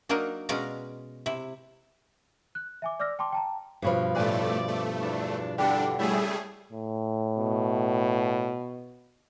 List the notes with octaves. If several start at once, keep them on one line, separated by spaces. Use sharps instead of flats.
F#3 A#3 D4 D#4 A#4
B2 G#3 C#4 D5 F5 A#5
C3 E4
F#6
E5 G#5 D6
D5 D6 E6 F6 A#6
G5 A5 C6 D6
G5 A5 A#5
G2 B2 F3 D4 C#5 B5
A2 A3 B4 D5 G#5
A3
E2 D4
E2 D3 G3 D4 G4 D5 F#5
C#3 G3 A3 C#4 E4 G#4
A2
B2